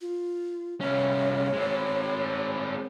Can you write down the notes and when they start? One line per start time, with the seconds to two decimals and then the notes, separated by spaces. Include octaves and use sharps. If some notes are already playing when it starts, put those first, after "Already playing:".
0.01 F4
0.80 C2 C#4 C#5
1.53 G#3 C4